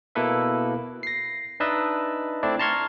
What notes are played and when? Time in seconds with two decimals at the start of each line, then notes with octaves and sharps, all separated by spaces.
0.15 B2 A#3 E4 A4 B4 E5
1.03 A#6 C7
1.60 D4 D#4 B4 D#5 E5 A5
2.43 A3 C4 D4 E4 D5
2.59 A5 A#5 C6 C#6 F6 G#6